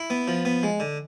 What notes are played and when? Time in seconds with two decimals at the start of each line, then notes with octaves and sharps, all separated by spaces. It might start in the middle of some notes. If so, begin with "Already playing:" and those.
Already playing: E4
0.10 B3
0.28 F3
0.45 B3
0.63 G#3
0.80 D3